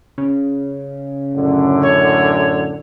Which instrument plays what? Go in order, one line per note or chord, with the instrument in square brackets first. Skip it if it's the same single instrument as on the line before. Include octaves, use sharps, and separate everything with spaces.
[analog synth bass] C#3
[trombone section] F#2 A2 D3
[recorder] C#5